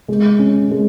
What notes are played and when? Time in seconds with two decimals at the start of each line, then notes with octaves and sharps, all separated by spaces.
0.08 G#3
0.39 C#4
0.71 G#3